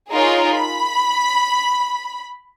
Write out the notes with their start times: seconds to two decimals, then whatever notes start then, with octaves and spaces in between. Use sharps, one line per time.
0.10 D#4 F4 G#4 A#4 C#5
0.54 B5